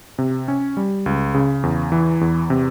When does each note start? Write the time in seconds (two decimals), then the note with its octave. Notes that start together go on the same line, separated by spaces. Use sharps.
0.18 C3
0.48 C#4
0.77 G3
1.06 C#2
1.34 C#3
1.63 E2
1.92 E3
2.21 E2
2.50 C3